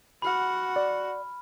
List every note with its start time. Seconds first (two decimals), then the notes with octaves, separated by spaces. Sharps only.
0.22 F#4 F#5 B5 F6
0.76 D5